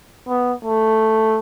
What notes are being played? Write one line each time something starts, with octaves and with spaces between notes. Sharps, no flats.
B3
A3